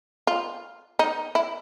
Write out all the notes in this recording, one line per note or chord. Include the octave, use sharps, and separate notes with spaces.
F4
D#4
E4